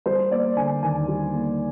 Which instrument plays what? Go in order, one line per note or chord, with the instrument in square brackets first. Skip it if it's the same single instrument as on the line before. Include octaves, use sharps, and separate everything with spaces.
[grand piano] G3 C5
A#3 D5
D3 G#5
D#2 G#5
G3
A#3